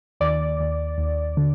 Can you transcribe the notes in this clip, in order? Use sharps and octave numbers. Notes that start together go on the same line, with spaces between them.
D#2 D5
D#2
D#2
D3